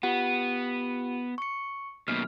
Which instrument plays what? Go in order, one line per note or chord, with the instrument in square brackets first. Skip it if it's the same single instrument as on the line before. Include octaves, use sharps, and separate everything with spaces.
[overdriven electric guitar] B3 [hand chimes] F4 G4 F#5
[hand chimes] C#6 C#7
[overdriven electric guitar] F#2 B2 [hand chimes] A#3 F6